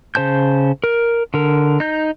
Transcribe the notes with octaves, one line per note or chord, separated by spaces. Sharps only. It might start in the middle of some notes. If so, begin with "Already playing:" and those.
C#3 C5 A5 G6
A#4
D3 A#4
D#4 G6